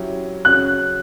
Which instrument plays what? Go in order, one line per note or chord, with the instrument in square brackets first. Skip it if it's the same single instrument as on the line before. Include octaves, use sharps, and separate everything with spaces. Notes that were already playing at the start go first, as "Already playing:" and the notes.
Already playing: [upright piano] F#3 C#4 E4 G4
[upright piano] C#3 F#3 C#4 [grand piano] F#6